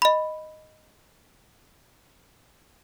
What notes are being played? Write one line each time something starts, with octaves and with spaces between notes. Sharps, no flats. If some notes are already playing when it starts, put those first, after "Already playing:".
D#5 B5